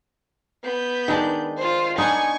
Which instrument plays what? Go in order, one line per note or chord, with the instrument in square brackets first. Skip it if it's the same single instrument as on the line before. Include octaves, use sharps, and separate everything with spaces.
[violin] B3 G6
[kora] D#3 G#3 D4
[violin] F4 C5
[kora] B3 D4 D#4 [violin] G#5 C#6